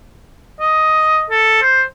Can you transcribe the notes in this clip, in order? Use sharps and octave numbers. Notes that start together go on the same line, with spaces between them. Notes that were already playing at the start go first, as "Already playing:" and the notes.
D#5
A4
C5